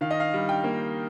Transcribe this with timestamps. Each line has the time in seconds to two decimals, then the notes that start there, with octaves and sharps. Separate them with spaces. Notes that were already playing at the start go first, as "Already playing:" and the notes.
0.01 D#3 F5
0.11 D#5
0.20 F5
0.34 G3
0.49 G5
0.64 A#3